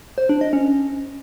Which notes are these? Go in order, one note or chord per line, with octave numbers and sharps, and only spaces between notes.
C5
D4
D#5
C#4